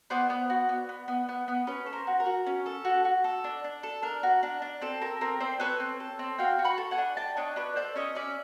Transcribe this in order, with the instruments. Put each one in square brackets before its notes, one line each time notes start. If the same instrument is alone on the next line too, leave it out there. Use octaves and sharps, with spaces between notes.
[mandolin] B3 C5 D5
B3
F#4
B3
B3
B3
B3
B3
C#4 B4 C#5
A4
A#4 C5
F#4
A#4
F#4
C#4
A4
F#4
F#4
A4
D4
D4
A4
D4 A#4
F#4
D4
D4
C4 A4
A4 A#4
C4 A#4
C4 C5 D5
A4 B4 C#5
C4
A4
C4
F#4 F5 G5
F#4
B5 C#6
A4
F#5 G#5
D4
D4 G5 A5
D4 C#5 D#5
D4 B4 C#5
A4 C5 D5
C#4 C#5 D#5
C#4 D5 E5